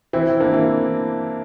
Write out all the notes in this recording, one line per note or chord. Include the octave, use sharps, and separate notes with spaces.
E3 C4 E4
A#3 D4
E3